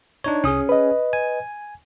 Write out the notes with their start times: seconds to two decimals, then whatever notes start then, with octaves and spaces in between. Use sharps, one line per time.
0.24 D4 D#4 C#5
0.44 C2 C#4 G#4 D#6
0.69 B4 D#5
1.13 G#5